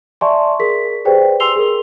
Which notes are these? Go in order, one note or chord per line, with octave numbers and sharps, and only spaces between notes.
D5 E5 G#5 A5 C6 C#6
G#4 A#4 B6
G4 G#4 B4 C5 D5 G5
G#5 C6 E6 C7 F7 G7
G#4 A#4